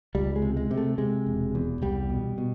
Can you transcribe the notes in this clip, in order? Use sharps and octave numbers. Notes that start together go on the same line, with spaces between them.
C#2 G3
G#3
C3
G#3
C3
A3
C3 G#3
E1
E2
C2 G3
B2
B2